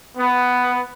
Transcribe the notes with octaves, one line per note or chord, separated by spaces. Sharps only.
B3